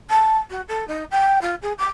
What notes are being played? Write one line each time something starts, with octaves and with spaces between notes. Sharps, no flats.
A5
F#4
A4
D#4
G5
F4
G#4
D6